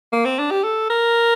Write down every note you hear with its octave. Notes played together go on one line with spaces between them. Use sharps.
A#3
C4
D4
G4
A4
A#4